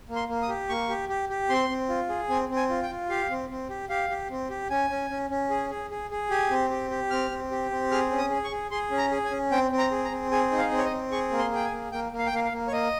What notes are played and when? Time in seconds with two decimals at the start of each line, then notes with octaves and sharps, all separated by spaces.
0.09 A#3
0.16 C6
0.29 A#3
0.42 D#6
0.49 G4
0.69 A#3 C#6
0.89 G4
1.09 G4
1.29 G4
1.49 C4 C6
1.69 C4
1.89 F4
2.09 G#4
2.29 C4 G#5
2.49 C4
2.56 G#5
2.70 F4
2.83 G5
2.90 F4
3.09 G4 F5
3.30 C4
3.50 C4
3.69 G4
3.89 G4 F5
4.10 G4
4.30 C4
4.50 G4
4.70 C#4 G#5
4.90 C#4
5.10 C#4
5.30 C#4
5.50 G#4
5.70 G#4
5.91 G#4
6.11 G#4
6.30 G4 G#5
6.50 C4
6.70 G4
6.91 G4
7.10 C4 F6
7.31 C4
7.51 G4
7.71 C4
7.91 G#4 F6
8.11 C#4
8.18 D#6
8.30 G#4
8.44 C#6
8.51 G#4
8.71 G#4 C6
8.91 C#4
8.98 A#5
9.11 G#4
9.24 G#5
9.31 C#4
9.51 C4 G5
9.71 C4
9.78 A#5
9.91 G#4
10.05 A#5
10.11 C4
10.31 G#4 G#5
10.51 D#4
10.58 F5
10.71 C4
10.78 C#5
10.85 D#5
10.91 C4
11.11 G#4 C#6
11.31 A#3
11.39 C6
11.51 G#4 G5
11.65 G#5
11.72 A#3
11.92 A#3 G5
12.12 A#3
12.19 F5
12.26 G5
12.32 A#3 F5
12.45 F5
12.52 A#3
12.67 C#5
12.72 A#3 D#5